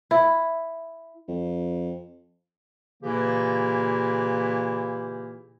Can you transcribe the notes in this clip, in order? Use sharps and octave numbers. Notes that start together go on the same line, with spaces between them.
E4
F2
A#2 C#3 E3 A#3 E4 G4